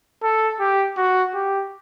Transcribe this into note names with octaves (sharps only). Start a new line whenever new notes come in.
A4
G4
F#4
G4